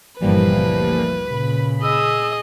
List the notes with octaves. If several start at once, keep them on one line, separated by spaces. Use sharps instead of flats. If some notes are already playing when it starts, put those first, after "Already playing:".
G1 G2 A#2 E3 F3 G3 A#3 B4
D2
A#2 C#3 B5
G#4 D#5 E6